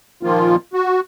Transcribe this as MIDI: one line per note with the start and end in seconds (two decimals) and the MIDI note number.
0.23 0.56 46
0.23 0.56 51
0.23 0.56 53
0.23 0.56 58
0.23 0.56 65
0.73 1.00 66